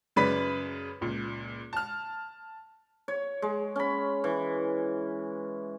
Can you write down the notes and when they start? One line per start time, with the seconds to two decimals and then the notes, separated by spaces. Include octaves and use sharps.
0.16 F#2 C#3 B4 D5 B5 B6
1.01 C#2 A#2
1.73 A5 F6
3.08 C#5
3.42 G#3
3.76 C#4 B5
4.24 E3